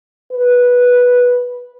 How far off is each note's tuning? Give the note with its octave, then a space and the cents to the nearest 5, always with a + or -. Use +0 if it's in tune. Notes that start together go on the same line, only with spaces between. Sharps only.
B4 -10